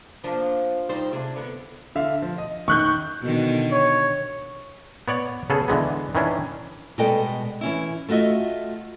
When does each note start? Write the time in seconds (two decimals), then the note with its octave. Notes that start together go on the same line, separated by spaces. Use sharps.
0.24 F3 A#3 D4
0.89 G3 D#4 C5
1.12 C3 D4 G#4
1.36 D3 B3
1.95 D3 E5 F5
2.22 F3
2.38 D#5
2.68 D#3 C#6 F#6 G6
3.21 B2 D3 D#3
3.72 C#5
5.08 B3 C#5 D5 F#5
5.50 C#3 B3 G#4 A4
5.68 D3 E3 G#3 B3
6.15 D#3 E3 C#4 D4
6.98 B2 G3 G#3 B3 A4 G5
7.61 E3 C#4 E4
8.08 A3 F4 F#4 D#5 E5